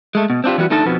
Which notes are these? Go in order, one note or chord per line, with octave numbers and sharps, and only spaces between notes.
G#3 A3
B2
C4 D4 F4 G4
E3 G3 B3 F#4
D3 A3 D#4 A4 A5
F2 B2 F3 B3